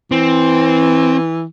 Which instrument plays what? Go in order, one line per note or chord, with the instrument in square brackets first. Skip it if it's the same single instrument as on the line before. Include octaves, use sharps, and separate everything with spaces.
[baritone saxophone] E3 [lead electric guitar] C4